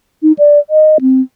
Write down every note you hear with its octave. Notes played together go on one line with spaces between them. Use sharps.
D#4
D5
D#5
C4